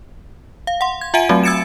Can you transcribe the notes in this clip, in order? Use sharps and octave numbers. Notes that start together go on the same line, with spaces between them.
F5
F#5 C6
G#6
F4 E5 F#5 G#5 D7 D#7
F#3 A3 C4 F#4
E6 G#6 A6 C#7 D7 E7